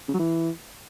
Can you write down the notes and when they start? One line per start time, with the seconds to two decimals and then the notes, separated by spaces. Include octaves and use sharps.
0.08 C#3
0.14 F#3
0.19 E3